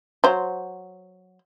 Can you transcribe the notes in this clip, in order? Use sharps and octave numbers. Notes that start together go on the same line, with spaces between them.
F#3 C5